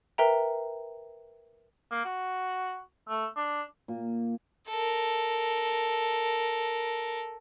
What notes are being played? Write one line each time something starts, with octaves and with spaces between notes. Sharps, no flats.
A#4 B4 E5 G5 A#5
A#3
F#4
A3
D4
A#2
A4 A#4